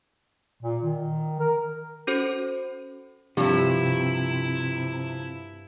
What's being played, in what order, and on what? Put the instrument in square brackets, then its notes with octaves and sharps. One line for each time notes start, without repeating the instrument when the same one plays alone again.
[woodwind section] A#2
D#3
A#4
[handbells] C#4 F#4 A4 C5
[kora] G2 [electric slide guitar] C3 [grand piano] F3 [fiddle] E4